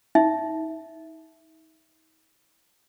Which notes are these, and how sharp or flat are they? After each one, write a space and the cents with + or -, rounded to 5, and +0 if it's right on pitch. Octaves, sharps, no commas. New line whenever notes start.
D#4 +35 E5 +0